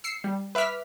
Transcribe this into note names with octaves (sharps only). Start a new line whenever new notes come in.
E6 C7 C#7
G3
B4 E5 D6 F6 B6